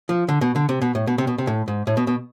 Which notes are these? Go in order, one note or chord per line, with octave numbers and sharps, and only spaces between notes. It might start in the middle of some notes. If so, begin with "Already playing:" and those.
F3
D3
B2
D3
C3
B2
A2
B2
C3
B2
C3
A2
G#2
A2
B2
B2